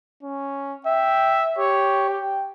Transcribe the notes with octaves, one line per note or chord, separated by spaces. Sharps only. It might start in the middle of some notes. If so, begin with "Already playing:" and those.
C#4
E5 G5
G4 C#5
G5